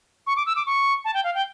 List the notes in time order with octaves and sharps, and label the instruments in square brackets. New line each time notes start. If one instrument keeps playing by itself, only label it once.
[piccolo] C#6
D6
E6
D6
C#6
A5
G5
F5
G5